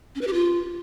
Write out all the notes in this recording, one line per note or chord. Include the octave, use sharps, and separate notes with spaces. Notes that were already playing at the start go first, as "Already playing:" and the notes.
C#4
B4
G4
F4